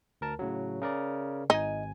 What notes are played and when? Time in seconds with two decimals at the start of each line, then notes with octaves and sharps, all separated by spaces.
0.21 D2 A#4 A5
0.39 A2 C#3 F#3
0.81 C#3 A#4 D5
1.50 G#1 D#4 G#5